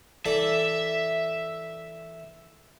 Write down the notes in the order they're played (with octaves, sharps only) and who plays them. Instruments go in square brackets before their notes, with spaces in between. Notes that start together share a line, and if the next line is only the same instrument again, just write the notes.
[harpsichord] E3 A4 D5 [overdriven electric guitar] E5